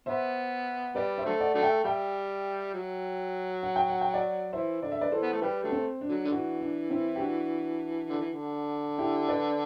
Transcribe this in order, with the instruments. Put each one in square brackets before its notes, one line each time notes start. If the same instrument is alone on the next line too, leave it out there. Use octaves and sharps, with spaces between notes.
[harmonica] B3 [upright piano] C5 E5
[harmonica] G3 [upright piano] B4 D5
[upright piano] C5 E5
[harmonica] D3 F#3 A3
[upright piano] D5 F#5
[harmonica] D3 F#3 A3
[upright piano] E5 G5
[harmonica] G3 [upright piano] E5 G5
[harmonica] F#3
[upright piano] F#5
G5
F#5
G5
D5 F#5
[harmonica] E3 [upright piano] C5 E5
[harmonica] D3 [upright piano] D5
[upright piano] E5
B4 D5
[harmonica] E3 [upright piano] A4 C5
[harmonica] B3
A3
[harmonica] G3 [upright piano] G4 B4
[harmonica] D3 F#3 A3
[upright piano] C4
D4
[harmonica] D3 F#3
D3
[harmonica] E3 [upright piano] D4 F#4
[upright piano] D4
C4 E4
G4
D4 F#4
[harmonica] D3
E3
D3
[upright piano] E4 G4
B4 D5